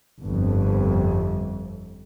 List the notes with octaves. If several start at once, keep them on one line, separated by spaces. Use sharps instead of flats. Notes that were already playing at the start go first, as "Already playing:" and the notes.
G1 F2